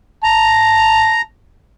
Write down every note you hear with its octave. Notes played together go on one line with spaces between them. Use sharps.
A5 A#5